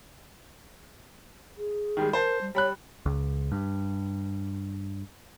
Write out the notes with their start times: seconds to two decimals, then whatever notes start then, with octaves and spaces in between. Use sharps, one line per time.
1.58 G#4
1.97 D#3 G3 G#3
2.13 A#4 C5 A5
2.41 G3
2.55 G3 C#5 B5 F#6
3.06 C#2
3.52 G2